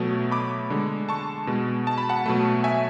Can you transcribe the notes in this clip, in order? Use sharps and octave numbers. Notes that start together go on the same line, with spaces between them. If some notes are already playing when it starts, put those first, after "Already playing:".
Already playing: B2 F#3 A3
B5 D6
D3 G#3
A5 C#6
B2 G#3
A5
B5
F#5 A5
B2 F#3 A3
E5 G#5